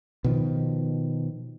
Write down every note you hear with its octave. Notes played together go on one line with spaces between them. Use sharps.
B2 D#3 F3